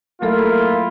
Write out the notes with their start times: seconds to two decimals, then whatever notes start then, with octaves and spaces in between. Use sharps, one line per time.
0.22 F#3 A3 A#3 E4 F4 A4